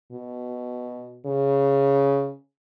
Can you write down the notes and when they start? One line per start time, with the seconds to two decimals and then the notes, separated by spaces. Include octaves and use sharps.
0.12 B2
1.26 C#3